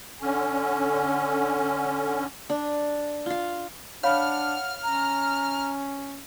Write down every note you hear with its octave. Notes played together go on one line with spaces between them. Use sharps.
D3 C#4
D4
F4 F5
D4 C#5 F5 F#5 B5 F6
C#4 A#5